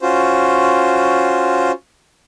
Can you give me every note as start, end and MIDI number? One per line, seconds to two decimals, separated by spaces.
0.01 1.72 61
0.01 1.72 65
0.01 1.72 66
0.01 1.72 72